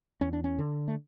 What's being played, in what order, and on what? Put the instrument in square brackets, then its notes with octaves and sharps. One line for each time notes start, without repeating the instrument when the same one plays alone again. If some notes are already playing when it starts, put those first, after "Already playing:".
[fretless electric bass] E2 C#4
D4
C#4
D3
A3